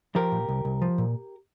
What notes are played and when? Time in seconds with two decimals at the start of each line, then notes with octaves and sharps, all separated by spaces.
0.15 F3 G4 A#4
0.32 A#2
0.49 C2
0.65 C2
0.82 F3
0.98 A#2